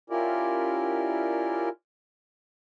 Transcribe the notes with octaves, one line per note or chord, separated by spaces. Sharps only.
C#4 E4 F4 G4 A#4 D5